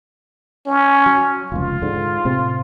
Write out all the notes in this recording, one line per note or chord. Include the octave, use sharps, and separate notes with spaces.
C#4
F#3
F1 C#2 F4
G#2 D3
A2 C3 C4